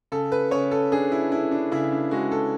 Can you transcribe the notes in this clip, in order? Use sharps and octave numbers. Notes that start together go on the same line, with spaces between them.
C#3 A4
B4
C#3 C#5
A4
D4 G#4
E4
D4 E4
D4
C#3 E4
D4
G#3 F#4
A4